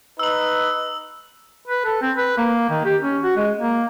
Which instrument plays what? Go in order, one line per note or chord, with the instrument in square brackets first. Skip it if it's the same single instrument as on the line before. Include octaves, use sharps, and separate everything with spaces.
[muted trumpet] D#4 [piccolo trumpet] B4 [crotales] E6 F#7
[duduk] B4
A4
C4
B4
A#3
D#3
G4
C#4
F#4
G#3
A#3